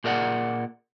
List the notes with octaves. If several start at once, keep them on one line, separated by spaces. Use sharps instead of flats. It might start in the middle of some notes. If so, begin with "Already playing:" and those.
A#2 G#4 A#4 D5 F#5